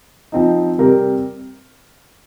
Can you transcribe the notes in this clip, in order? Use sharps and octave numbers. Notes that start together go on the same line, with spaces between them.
F3 C4 D#4
C3 G3 C4 G4 A#4